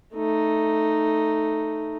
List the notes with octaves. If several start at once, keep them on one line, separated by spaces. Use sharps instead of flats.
A3 D#4